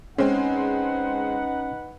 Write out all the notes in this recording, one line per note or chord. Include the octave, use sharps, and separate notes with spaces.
G#3 C4 C#4 D#4 B4 F#5